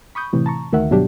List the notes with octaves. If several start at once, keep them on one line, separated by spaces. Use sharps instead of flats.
B5 C#6 D#6 G6
A2 C3 E3
A5 A#5 C#6
D2 D#3 A#4 E5 F#5
G2 B2 F#3 D4 G4